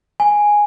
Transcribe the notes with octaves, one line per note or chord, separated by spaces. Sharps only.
G#5